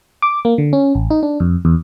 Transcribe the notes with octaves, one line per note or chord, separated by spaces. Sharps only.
D6
A#3
D3
C#4
A1
D#4
D4
F2
E2